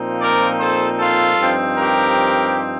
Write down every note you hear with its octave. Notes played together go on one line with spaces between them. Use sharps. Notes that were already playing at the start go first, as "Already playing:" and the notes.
Already playing: A#2 F3 C4 D#4
A#4 D5
A4 C5
F4 A4
G2 F3 C4 D#4
G4 A#4